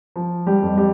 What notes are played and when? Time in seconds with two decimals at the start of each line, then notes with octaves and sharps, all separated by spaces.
0.16 F3
0.47 G3 G4
0.63 F2
0.77 G3 G4